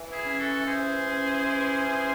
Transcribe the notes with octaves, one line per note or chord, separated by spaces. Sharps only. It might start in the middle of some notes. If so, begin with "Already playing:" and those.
Already playing: E3
E4 G#4
C#4
F#4 A4
E3 G#4 C5
C#4
E3
C#4